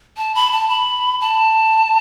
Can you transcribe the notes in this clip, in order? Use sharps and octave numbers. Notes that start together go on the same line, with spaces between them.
A5
B5
A5
B5
A5